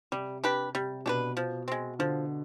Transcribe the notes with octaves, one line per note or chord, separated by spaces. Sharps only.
C3 G3
D4 G4 B4
C3 G3
B2 D4 G4 B4
F3
G#3 C4
D3 F3